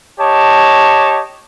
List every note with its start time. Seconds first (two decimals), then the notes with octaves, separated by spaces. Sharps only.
0.20 G4 C#5 D#5 A5